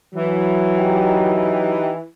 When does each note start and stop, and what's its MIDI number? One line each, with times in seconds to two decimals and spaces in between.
0.15 2.07 52
0.15 1.82 54
0.79 1.92 63
0.79 1.92 67